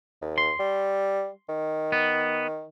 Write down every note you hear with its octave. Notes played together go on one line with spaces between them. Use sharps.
D#2
C6
G3
D#3
B3